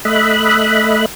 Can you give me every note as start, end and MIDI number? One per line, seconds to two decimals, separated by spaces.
0.05 1.05 57
0.05 1.05 75
0.05 1.05 76
0.05 1.05 83
0.05 1.05 90